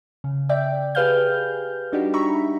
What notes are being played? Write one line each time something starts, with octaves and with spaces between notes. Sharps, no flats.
C#3
D5 E5 G5
G4 G#4 B4 F5 F6 G6
G3 D4 D#4 F#4 G4
E5 A#5 B5 C#6